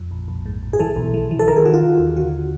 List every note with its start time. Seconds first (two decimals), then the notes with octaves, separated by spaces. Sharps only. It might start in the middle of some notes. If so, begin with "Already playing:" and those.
Already playing: F2
0.11 A#1
0.28 A#1
0.46 G#2
0.63 A#1
0.73 G#4
0.79 E3 A4
0.96 B1
1.14 E3
1.31 E3
1.39 A4
1.48 D#3 A#4
1.56 G#4
1.65 D#3 F#4
1.74 F4
1.83 D#3
1.99 D#2
2.16 D3 F#4